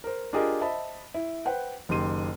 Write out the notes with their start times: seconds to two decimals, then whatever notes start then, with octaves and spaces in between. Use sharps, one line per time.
0.04 A#4 C5
0.33 D4 F4 G4 G#4 A#4 D#5
0.61 C5 D#5 E5 A5 B5
1.14 E4
1.45 B4 C5 F#5 G5
1.89 F#1 D#3 G4 C6 D#7